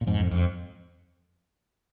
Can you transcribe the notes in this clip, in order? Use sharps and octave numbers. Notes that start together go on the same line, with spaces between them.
A#2
F2 G#2
F2
F2